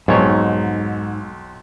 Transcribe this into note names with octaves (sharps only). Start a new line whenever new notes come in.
B1 F2 G#2 C#5